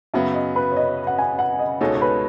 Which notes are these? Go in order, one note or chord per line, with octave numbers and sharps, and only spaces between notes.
F#2 C#3 F#3 B3 E5
D#5
B4
C#5
D#5
F#5
G#5
F#5
D#5
C#2 B2 G#3 D#4 A4 C#5
C#5
B4